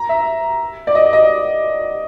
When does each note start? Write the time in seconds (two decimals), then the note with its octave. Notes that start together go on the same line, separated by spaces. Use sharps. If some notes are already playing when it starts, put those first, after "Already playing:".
Already playing: A#5
0.09 E5
0.87 D5
0.95 D#5
1.13 D#5